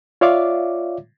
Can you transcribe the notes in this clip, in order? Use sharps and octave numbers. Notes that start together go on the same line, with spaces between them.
F4 C#5 D5 E5 F5 D6